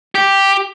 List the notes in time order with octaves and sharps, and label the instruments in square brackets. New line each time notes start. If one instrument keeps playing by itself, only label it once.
[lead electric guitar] G4